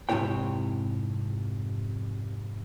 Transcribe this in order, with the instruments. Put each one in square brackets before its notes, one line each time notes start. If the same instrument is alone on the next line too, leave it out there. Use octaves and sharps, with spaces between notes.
[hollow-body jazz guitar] F2 G#2 C3 E4 C#5 G5